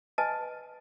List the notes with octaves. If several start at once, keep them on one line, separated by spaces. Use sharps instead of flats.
B4 D#5 G#5 A5